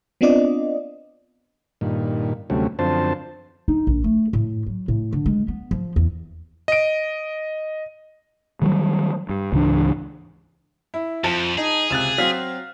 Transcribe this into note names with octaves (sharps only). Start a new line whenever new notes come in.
B3 C4 D4 F4 D5 D#5
G2 A#2 D#3
D2 C3 F#3 G3 A3 C#4
F#2 D3 F3 C4 C5 A5
D#4
A#1
A3
A2
F#3
A2
D3
G#3
B3
F3
E2
D#5 D7
D#3 F#3 G3
G2
C#2 G#2 E3 D4
E4
F2 F3 A5
D#4 G#4
C#2 C3 F#6 A6 E7
F#3 C4 F5 F6 B6